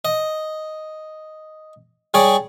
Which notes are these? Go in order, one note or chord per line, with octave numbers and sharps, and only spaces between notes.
D#5
G3 G#4 C#5 D5